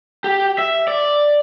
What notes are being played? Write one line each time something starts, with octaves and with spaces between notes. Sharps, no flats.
G4
E5
D5